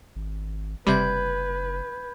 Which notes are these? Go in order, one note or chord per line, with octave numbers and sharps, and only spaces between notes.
G#1
F#1 C3 G3 B4 B5 G6 G#6